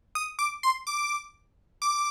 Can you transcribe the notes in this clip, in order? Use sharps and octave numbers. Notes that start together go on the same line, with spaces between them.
D#6
D6
C6
D6
D6